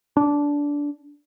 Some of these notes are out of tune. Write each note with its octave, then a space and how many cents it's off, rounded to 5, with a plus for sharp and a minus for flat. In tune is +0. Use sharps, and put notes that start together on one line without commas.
D4 -15